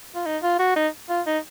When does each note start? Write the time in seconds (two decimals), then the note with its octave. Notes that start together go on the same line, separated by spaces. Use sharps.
0.15 F4
0.26 D#4
0.43 F4
0.59 F#4
0.76 D#4
1.09 F4
1.26 D#4